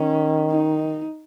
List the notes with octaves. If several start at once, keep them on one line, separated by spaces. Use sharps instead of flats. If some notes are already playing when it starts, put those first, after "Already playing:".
Already playing: D#3 C#4
D#4